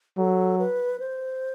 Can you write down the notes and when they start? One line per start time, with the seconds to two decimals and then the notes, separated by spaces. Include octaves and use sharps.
0.17 F#3 A4
0.59 B4
1.00 C5